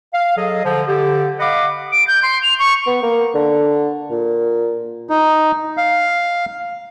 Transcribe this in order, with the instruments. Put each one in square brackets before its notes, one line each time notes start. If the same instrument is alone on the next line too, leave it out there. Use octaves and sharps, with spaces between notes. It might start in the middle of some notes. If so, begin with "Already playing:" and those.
[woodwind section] F5
F#3 G#4 A4 D#5
D3 F3
D3 G4
D#5 F5 F#5 B5 D6
[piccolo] D7
G6
C6
F7
C#6
[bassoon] B3
A#3
D3
A#2
[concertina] D#4
F5